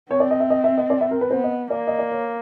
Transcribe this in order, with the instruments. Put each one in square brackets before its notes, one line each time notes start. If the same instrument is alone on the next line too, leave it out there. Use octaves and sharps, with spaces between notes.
[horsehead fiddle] C4 [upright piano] C#5
[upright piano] D5
D#5
E5
D#5
E5
D#5
D5
E5
A#4
B4
[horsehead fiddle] B3 [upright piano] C5
[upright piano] D#5
[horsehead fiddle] A#3 [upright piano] D5
[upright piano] D#5
D5
C#5